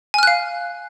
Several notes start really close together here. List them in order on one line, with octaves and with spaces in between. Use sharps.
G#5 F6 F#6 F5